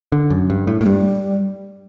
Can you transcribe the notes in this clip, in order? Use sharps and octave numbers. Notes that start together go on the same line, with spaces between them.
D3
F#2
G2
A2
A2 A3
G2 G3